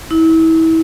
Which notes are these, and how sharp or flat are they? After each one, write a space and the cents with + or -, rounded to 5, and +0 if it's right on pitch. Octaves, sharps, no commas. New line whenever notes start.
E4 -30